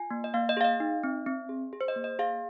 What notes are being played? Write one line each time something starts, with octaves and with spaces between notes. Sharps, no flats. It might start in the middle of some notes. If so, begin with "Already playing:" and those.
Already playing: F4 G#5
A#3
D#5
A#3 F5
D#5
G#4 F5
D#5
D#4
C4
C4
G#4
G#4
C5
D#5
A#3
D#5
G#4 F5